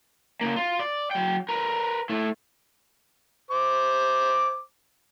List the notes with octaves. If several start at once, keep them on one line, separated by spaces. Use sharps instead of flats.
C#3 A#3
F4
D5
F#3 G5
A#4 B4
A3 E4
C5 D6